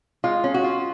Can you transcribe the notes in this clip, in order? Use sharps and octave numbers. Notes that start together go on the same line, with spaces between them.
G#3 F4
C#4
F#4
F4